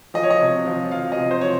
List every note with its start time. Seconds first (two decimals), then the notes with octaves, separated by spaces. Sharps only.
0.14 F3 D#5
0.23 C#5
0.30 D#5
0.41 C3
0.66 F3
0.91 F3 F5
1.12 D#5
1.18 C3
1.31 C5
1.41 F3 C#5